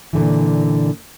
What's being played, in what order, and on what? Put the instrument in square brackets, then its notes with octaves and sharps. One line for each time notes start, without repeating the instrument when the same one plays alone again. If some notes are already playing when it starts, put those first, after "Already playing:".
[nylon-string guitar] A#2 D3 E3